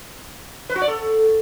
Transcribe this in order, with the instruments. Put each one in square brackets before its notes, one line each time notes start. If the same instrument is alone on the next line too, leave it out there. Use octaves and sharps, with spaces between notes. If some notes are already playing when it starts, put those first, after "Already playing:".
[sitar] B4
F#4
D5
A4